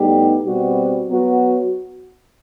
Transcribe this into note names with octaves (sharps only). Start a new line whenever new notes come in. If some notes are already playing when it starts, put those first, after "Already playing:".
Already playing: A2 G3 B3 D#4 G4
B2 G3 C4 F#4
F#3 B3 F#4